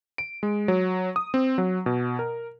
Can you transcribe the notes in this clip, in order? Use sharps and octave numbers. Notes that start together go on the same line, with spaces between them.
D7
G#3
F#3
D#6
C4
F#3
B2
A#4